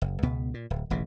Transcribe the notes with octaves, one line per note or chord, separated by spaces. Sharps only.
F#1
C#2 B2 B3
A#2
D1
E1 A1 A#2 C#3